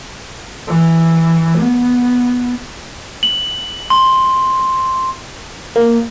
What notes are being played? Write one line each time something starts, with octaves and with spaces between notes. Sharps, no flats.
E3
B3
F#7
C6
A#3